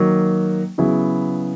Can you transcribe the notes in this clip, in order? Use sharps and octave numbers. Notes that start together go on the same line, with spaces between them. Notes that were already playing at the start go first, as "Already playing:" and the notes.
Already playing: D#3 F#3 A#3
C#3 F#3 B3 E4